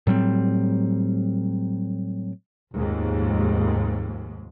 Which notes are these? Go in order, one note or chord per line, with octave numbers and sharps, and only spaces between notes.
A2 F#3 G3 C4
F1 D#2 G#2